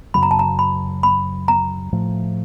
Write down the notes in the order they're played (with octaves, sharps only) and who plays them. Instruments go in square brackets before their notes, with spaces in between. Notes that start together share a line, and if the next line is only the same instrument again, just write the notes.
[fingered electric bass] F#2 C#3 F#3 [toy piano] B5
[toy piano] A#5
A5
A#5
B5
B5
A#5
[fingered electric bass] A2 F3 A3